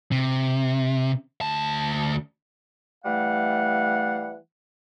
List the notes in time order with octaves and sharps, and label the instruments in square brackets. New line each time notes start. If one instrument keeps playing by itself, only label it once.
[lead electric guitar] C3
D2 A5
[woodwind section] E3 G3 A3 F5 F#5